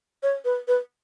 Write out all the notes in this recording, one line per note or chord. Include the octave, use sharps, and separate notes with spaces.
C#5
B4
B4